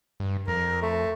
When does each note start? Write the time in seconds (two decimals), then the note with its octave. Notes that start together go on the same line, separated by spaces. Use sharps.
0.20 G2
0.48 F2 A#4
0.82 A3